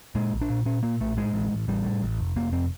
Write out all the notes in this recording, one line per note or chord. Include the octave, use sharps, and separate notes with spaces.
A#2 G#3
A#1
D4
A#2
A#2 C#4
A#2 A#3
A#1 A3
A2 G#3
A1
A1
A1 G3
A2
A1
F1
F1 A#3
F2 C4